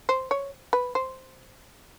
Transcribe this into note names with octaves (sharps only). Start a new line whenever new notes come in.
C5
C#5
B4
C5